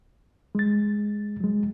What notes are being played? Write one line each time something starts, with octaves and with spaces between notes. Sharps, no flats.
G#3 A6
F#3 G#3